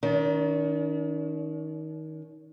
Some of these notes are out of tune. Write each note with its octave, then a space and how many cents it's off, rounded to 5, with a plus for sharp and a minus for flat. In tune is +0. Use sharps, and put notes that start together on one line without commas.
D#3 +20 D4 -45